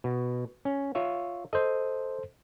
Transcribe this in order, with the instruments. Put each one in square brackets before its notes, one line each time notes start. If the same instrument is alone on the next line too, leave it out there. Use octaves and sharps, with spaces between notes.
[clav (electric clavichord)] B2
C#4
F4 C#5 E5
[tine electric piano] A4 C5 [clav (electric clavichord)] D#5